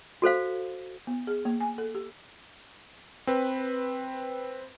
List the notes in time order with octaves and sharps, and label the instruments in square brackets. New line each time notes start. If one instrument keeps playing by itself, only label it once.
[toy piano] F#4 A4 C5 F5
[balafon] B3
G#4
A#3
G#5
A4
G4
[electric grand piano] C4 B4